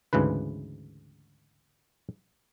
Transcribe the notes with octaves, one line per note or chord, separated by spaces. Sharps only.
D2 G#2 C#3 E3 B4